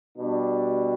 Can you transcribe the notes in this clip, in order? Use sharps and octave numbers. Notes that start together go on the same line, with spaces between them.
B2 G3 D4